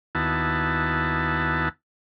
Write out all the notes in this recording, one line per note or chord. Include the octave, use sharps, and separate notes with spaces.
D#2 B3 E4 F#4 A5